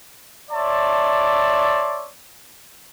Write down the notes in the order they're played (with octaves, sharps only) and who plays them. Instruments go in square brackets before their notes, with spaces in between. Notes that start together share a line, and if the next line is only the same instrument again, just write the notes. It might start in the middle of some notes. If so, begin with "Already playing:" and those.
[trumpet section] C#5 D5 E5 A5 C6